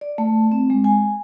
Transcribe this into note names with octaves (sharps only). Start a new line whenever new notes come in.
D5
A3
C4
G#3
G#5